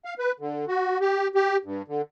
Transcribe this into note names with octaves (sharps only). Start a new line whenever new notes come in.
F5
B4
D3
F#4
G4
G4
G2
D3